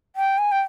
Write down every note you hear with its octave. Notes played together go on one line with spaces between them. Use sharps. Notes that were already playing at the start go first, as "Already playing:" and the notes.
G5
G#5
G5